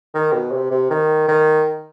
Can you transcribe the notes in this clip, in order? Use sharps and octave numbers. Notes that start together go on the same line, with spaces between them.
D#3
B2
C3
C3
D#3
D#3